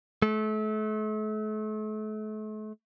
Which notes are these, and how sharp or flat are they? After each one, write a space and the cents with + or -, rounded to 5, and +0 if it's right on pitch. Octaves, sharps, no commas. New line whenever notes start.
A3 -40